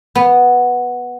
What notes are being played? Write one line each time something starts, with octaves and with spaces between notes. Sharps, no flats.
B3